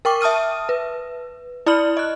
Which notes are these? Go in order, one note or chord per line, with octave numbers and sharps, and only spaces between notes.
A#4 G5 C#6 D6
E5 A5 D#6 F6 D#7
B4
E4 D5 B5 F6 F#7
D#5 F#6